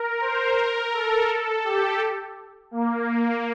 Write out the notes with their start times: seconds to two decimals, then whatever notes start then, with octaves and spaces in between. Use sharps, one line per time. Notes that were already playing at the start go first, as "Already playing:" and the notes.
Already playing: A#4
0.20 C5
0.57 A#4
0.92 A4
1.28 A4
1.64 G4
2.71 A#3